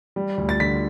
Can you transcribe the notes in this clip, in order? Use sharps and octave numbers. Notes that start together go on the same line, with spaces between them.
G3
D2
A6
D3 B6